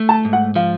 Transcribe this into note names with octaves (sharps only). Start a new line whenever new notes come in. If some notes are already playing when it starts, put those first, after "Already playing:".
Already playing: A3
A5
G#2
F#5
F3 F5